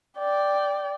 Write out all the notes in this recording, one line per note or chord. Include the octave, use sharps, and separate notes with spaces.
D5 G5